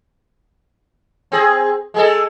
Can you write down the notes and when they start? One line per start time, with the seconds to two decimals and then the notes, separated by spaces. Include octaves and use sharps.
1.32 C4 G#4
1.94 G#3 G#4 A4